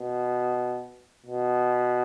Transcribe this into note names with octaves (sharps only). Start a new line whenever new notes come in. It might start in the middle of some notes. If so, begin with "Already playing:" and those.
Already playing: B2
B2